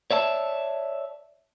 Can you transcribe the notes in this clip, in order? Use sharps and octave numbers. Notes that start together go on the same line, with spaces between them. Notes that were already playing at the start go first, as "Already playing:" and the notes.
C#5 D5 E5 A5